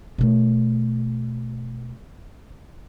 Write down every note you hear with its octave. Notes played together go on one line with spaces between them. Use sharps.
B2 A3